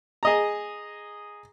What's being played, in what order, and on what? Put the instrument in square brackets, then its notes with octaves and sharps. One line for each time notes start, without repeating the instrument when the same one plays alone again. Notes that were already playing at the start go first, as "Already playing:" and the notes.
[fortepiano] G#4 D#5 A#5